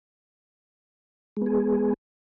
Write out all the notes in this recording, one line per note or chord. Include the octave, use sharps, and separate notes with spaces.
G#3 B3 G#4